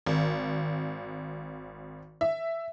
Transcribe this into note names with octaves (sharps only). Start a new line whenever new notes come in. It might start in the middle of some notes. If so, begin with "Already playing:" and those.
G#1
E5